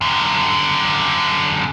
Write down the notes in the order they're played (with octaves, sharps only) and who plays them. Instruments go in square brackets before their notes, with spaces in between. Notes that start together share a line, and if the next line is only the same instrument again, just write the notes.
[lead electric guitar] F#2 D3